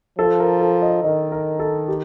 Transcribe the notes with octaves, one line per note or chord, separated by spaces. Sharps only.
F3 A4
A#4
A4
D#5
D#3 D#5
A#4
A4
G4